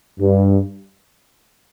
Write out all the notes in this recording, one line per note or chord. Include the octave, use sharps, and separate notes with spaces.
G2